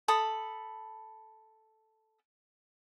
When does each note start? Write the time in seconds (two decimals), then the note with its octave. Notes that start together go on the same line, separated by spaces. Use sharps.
0.08 A4 B5 D#6